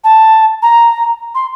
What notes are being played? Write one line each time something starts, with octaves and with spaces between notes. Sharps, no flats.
A5
A#5
C6